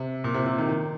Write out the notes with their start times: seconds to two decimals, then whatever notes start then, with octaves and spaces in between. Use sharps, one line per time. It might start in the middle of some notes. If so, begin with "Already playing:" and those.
Already playing: C3
0.24 A#2
0.34 C3
0.46 C3
0.58 D#3
0.69 D#3